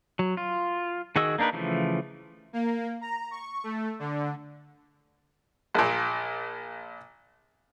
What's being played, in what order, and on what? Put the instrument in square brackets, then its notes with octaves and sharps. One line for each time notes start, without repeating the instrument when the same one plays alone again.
[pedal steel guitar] F#3
F4
D#3 F#4 G#4 D#5 E6
A#3 D4 D#4 A#4 B4
C#3 E3 F3 A3
[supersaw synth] A#3
A#5
C#6
A3
D3
[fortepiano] A#1 A#2